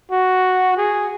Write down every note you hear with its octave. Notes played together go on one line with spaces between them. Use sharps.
F#4
G#4